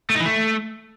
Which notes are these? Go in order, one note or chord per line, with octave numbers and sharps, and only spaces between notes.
A3
D#4
E3
A3